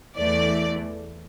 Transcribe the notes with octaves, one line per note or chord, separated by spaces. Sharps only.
E2 E3 A3 D5